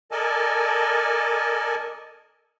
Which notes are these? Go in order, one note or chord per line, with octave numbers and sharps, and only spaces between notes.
A4 A#4 D5 D#5 G#5 A5